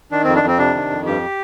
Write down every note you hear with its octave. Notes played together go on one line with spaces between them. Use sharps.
D#3 D4
F2 C4
D4
F2 C4
C3 D4
D#3
F2
G2 G4